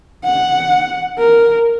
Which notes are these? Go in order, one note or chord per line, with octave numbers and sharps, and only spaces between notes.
F#5
A#4